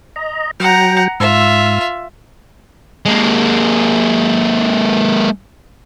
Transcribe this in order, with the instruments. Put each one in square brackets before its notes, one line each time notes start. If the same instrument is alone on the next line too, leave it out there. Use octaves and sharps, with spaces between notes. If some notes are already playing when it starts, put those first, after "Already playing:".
[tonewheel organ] D#5 A#5
[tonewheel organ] F#3 G5 [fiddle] F#5 A#5
[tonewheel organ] G#2 E6 [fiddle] F4 E5
[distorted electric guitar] G#3 A#3